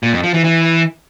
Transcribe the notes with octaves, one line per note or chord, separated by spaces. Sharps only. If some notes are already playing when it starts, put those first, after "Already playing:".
A#2
F2
F3
E3
E3